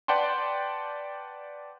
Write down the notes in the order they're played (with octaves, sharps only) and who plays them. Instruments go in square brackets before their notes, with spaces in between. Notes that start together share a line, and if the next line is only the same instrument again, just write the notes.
[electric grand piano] B4 D5 F#5 G5 A5 C6